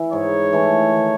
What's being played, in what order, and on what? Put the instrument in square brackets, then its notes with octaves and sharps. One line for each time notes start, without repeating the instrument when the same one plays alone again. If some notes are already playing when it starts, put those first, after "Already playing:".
Already playing: [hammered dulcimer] E3 E4
[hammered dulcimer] G#2 [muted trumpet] C#5
[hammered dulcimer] E3 A3 E4
D#3